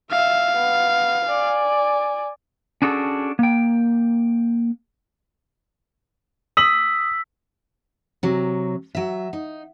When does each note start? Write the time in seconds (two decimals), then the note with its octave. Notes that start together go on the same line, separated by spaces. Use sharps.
0.11 E5 F5
0.57 B3
1.26 D5 G#5
2.82 C#4 D4 F#4 G#4 A4
3.39 A#3 G5
6.57 D#6 E6 B6 F#7
8.23 C3 F#3
8.95 F#3 E5
9.33 D#4